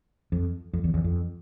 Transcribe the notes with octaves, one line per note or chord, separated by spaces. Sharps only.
F2
F2
E2
E2
F2